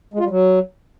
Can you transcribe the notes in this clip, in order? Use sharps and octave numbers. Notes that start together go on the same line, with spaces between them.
G#3
F4
G3
F#3